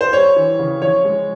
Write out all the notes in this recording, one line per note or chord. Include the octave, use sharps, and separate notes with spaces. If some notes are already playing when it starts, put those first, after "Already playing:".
C5
G3 C#5
E3
C#3
F3 C#5
G#3